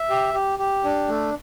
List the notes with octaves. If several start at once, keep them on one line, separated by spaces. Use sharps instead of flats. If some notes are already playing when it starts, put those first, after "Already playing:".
Already playing: E5
G4
G4
G4
D4
A3